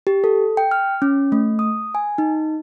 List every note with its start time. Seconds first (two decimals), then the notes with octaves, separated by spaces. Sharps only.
0.07 G4
0.24 A4
0.57 G5
0.71 F6
1.02 C#4
1.32 A3
1.59 D#6
1.95 G#5
2.18 D#4